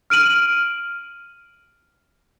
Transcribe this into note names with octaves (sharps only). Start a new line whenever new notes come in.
F6 D7 D#7 F#7